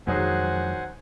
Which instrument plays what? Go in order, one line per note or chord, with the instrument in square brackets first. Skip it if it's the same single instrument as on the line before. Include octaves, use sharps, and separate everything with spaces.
[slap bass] F2 G#3 [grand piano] D#3 F#3 G#4 [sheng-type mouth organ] C5 F#5 G#5